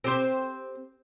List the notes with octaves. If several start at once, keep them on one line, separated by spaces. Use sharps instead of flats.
C4 G4 C5